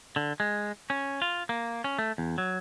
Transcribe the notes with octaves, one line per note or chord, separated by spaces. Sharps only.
D3
G#3
C#4
F4
A#3
C#4
A3
E2
F#3